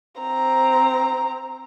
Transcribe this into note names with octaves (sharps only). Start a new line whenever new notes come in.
C4 A#5